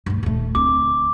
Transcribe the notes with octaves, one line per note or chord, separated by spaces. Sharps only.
D2 G2
D#1 A3
D2 C4 D6